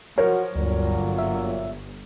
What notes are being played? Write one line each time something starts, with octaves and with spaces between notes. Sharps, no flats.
F3 F#4 A#4 C#5
G1 D2 A#2 F#3
E5